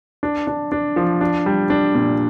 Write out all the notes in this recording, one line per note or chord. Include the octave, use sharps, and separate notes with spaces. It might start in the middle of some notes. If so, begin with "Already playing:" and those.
D4
D4
D4
F3
D4
G3
D4
A#2